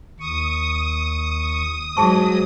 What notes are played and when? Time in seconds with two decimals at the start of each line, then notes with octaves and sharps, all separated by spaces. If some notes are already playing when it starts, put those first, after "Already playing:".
0.19 D#2 C#6 D#6
1.97 G#2 F#3 G#4 A5 C#6